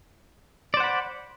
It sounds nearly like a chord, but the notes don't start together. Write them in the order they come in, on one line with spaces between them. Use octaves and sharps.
D5 C5 F#5 B5